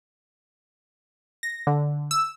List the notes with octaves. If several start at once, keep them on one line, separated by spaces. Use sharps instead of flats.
A#6
D3
E6